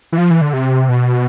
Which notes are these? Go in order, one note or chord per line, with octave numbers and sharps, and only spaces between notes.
E3
F3
E3
D3
C3
B2